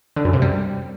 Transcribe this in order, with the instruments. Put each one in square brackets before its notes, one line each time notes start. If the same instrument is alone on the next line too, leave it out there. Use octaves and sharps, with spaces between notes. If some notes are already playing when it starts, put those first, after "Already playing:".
[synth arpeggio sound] D3
F#2
C3
G3